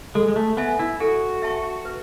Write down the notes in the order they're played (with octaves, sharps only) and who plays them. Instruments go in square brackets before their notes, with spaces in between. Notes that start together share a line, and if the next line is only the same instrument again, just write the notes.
[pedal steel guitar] G#3 [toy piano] A4
[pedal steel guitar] G#3
A3
[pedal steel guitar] B3 [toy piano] E5 G#5
[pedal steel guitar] E4
[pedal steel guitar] F#4 [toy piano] A4
[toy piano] E5 A5 C#6
B4